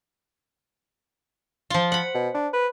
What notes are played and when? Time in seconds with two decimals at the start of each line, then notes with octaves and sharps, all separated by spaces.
1.70 F3 F4
1.92 F#5 B5
2.14 B2
2.34 D4
2.53 B4